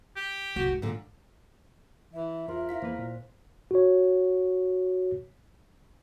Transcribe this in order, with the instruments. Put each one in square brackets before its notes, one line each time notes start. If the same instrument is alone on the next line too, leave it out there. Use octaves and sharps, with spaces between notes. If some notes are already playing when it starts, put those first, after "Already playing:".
[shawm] G4
[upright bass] C2 A2 [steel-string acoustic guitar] F#4
[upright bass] G#2
[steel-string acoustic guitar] A#2 D3
[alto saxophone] E3 [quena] E5
[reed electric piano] E2 F4 [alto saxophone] A#4 [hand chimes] C5 C6
[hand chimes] E4 F5 B6
[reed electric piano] E2 A#3 B4 [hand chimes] C5
[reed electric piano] A#2
[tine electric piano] F#4 C#5